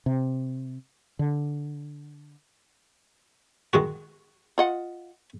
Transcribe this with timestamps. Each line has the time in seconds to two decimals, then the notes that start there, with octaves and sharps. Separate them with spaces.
0.06 C3
1.19 D3
3.73 D#3 G#3 F#4
4.58 F4 D#5 F#5